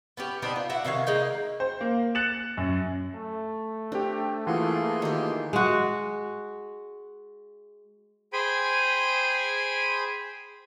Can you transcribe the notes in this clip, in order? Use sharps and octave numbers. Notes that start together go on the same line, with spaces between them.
B3 C#4 G4
B3 C4 D4 D#4
F4
F#4 E5 F#5
C3 D#3 C#5 F5
G#3 A#3 D#4
C5
A#3
F#6 A6 C#7 E7 F#7
F#2
A3
C4 D4 G4
E3 A#3 F4 G#4 F#5 C6
D#3 G4
G#3 F#4
G#4 C5 G5 G#5 B5